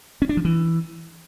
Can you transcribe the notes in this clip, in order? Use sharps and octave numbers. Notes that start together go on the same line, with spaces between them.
C#4
D4
F3
E3